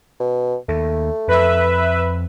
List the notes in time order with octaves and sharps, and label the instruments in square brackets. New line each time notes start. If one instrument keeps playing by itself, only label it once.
[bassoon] B2
[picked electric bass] D#2 [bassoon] A3
[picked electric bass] F2 [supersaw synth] B4 E5